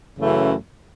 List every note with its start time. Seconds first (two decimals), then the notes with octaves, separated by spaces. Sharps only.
0.18 F#2 C#3 E3 A3